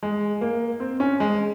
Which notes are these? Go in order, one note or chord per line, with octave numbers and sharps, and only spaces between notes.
G#3
A#3
C4
C#4
G#3